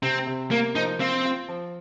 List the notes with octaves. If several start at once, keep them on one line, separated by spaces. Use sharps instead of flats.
C3 C4
C3
A#3 A#4
F3 D#4
C4 F4
F4
F3